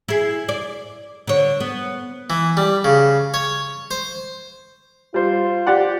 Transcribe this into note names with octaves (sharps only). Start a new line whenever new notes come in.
E4 G#4
D5
D3 C#5
B3
E3
G3
C#3
C#5
C5
G3 F4 C5
G4 D5 F#5